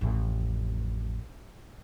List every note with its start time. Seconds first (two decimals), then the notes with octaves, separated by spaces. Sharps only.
0.01 A1 F2